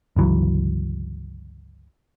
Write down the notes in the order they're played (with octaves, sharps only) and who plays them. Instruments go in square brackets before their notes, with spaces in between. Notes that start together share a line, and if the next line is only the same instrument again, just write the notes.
[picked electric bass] G1 C#2 E3 F#3